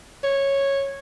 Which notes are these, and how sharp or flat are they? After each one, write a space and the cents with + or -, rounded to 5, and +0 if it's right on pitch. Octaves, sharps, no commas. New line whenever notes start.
C#5 -10